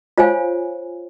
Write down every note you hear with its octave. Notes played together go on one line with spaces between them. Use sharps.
F4 C5 C#5 F5 G#5